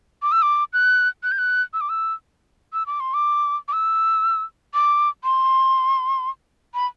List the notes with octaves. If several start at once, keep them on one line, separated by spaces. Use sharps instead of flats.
D6
E6
D6
F#6
F#6
G6
F#6
E6
D6
E6
E6
D6
C6
D6
D6
E6
D6
C6
B5